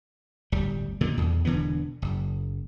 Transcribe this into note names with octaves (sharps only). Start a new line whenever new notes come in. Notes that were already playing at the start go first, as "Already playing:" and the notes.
D1 G1 G3
A#2 D3 D#3
E2
E1 D3 E3 B3
F#1